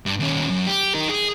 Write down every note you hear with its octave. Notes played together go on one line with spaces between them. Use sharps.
G2
D#2 C#4
F#2
G4
D#4 A#4
G#4